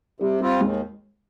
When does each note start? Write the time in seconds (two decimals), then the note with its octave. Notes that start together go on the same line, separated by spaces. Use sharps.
0.20 C3 G3
0.41 G3 C4 F4
0.61 D#2 G#3